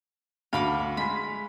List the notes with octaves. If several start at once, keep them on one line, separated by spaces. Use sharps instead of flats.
D2 F5 B5 D6
G#3 B5 B6